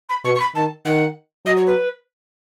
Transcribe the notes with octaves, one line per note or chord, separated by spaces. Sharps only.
B5
B2 C#6
C#6
B5
D#3 A5
D#3 F#5
F#3 D#5
C#5
B4